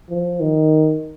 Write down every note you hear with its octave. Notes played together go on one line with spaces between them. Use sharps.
F3
D#3